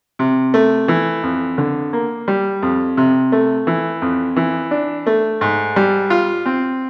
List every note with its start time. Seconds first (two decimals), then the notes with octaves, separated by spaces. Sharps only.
0.19 C3
0.54 A3
0.88 E3
1.23 F2
1.58 D3
1.93 A#3
2.28 G3
2.62 F2
2.97 C3
3.32 A3
3.67 E3
4.02 F2
4.36 E3
4.71 D4
5.07 A3
5.41 G#2
5.76 G3
6.10 F4
6.46 C4